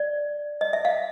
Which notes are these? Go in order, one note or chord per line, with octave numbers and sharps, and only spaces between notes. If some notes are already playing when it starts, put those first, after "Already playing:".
Already playing: D5
D#5
E5
F5